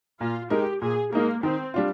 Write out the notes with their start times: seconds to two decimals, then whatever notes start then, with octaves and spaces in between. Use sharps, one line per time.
0.20 A#2 F4
0.50 G#3 D#4 G4 A#4
0.82 A#2 G#4
1.13 G#3 A#3 D#4 A#4
1.43 D#3 C4
1.74 G3 D4 F4